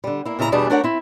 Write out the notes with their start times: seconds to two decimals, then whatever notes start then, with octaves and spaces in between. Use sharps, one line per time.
0.04 D3 G3
0.25 A#3 E4
0.39 A#2 C#3 E4 G#4 A#5
0.52 E2 B2 G3 D4 G#4 A5
0.70 A3 D4 F#4 A#4 C#5 F#5
0.84 C4 E4